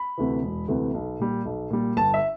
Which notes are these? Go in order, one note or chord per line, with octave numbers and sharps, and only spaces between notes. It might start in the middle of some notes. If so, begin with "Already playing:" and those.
Already playing: B5
D2 C3 E3
E1
D2 C3 E3
B1
A#2 G3
B1
A#2 G3
G1 A5
E5